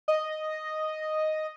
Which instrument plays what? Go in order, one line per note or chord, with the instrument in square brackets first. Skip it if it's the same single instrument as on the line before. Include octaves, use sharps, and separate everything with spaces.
[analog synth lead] D#5